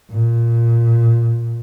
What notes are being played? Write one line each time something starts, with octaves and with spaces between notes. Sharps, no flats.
A#2